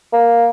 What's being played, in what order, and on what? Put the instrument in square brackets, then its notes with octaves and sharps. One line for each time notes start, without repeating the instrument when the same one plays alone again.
[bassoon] A#3